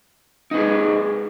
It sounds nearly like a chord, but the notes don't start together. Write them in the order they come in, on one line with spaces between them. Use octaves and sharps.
D#4 B4 G#4